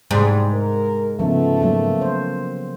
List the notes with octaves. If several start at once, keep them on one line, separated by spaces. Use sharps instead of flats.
G#2 C3 G3
A#4
C#3 F3 A3 B3
F#3 A#3 A4
C5